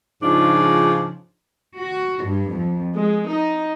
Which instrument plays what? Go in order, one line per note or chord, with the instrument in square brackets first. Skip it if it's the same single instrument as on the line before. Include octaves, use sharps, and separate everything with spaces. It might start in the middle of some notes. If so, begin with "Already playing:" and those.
[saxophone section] G#2 C#3 F3 D4 D#4 F4
[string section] F#4
G2
F2
G#3
D#4